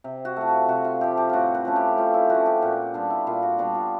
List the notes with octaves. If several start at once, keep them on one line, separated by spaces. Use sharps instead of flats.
C3
F#4
F3 A3
F#4
C3 F#4
F4
F3 A3 G4
G4
A2 F4 F#4
B4
F3 A3 C#4
G4
A2 F4
E4
F3 A3 C#4 F#4
G4
A#2 F#4
G3 B3 D4 F4
E4
A#2 F4
F#4
G3 B3 D4 F#4
F4